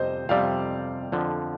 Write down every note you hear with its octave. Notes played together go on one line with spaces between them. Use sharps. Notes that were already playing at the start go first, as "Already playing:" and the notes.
Already playing: F2 C3 G3 C5 D#5
F2 C3 G3 D5 F5
F2 D3 F3